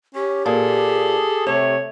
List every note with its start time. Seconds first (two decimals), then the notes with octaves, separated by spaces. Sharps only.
0.15 C#4 G4
0.46 A#2 G#4 A4
1.47 C3 A3 C#5